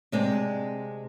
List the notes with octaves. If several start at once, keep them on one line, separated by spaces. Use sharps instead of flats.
C3 G#3 C4 D4